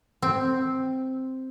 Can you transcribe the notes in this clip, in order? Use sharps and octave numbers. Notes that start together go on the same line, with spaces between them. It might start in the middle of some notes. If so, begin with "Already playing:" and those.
C4